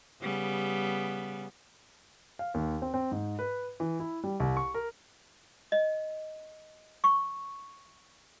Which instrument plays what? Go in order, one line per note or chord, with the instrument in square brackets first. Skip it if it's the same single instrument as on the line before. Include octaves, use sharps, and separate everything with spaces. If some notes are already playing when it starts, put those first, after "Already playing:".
[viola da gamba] C#3 G3 B3
[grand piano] F5
D#2
C4
C4
G#2
B4
E3
E4
G3
C2
C#6
A#4
[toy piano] D#5
C#6